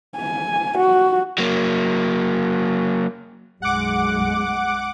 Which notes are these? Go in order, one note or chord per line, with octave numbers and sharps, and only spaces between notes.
G#5
F#4
F#3 A#3
B1 F#2 G#3 F#5 D6